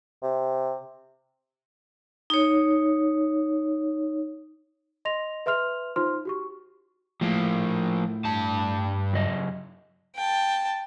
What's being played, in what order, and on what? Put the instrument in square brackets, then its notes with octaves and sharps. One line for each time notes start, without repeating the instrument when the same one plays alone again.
[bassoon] C3
[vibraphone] D#4 C#5
[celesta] D#5 C6 A#6 F7
B4 E5 C6 F6 F7
D#4 F4 C5 C6 F6
F#4 G4 C#6
[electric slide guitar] A2 [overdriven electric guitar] F3 A#3
[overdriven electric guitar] G2 A5
[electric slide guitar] F#2 C#3 D#5
[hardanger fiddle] G5 A5